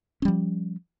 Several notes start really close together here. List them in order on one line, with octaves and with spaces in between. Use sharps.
C#4 G3 F3